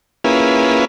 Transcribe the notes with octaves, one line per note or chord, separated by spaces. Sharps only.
A#3 C#4 E4 F4 G#4 B4